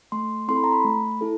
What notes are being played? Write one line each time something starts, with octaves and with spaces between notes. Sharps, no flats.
A3 C6
C4 E4 A4 C6
B5
A#5
B5
A3
E4 A4